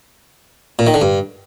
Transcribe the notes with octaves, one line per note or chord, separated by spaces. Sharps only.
A#2
D#3
D3
G2